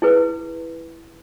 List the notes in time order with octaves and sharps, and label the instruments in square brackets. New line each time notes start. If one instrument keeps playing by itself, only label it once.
[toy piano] E4 G#4 B4